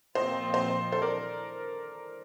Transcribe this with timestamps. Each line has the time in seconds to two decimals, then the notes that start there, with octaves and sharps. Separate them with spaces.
0.15 A#2 F3 C4 F4 C5 D#5
0.54 C5 D#5
0.92 A4 C5
1.02 A#4 D5